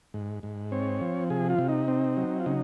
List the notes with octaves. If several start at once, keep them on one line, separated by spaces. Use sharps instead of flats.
G#2
G#2
C4 C#5
F3
C3 G#4
F4
C3
D#4
C4
F#3
F4
C#3 D#4